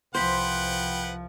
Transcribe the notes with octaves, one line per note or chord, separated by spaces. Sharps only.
C2 F3 B4 C5 F#5 G5 B5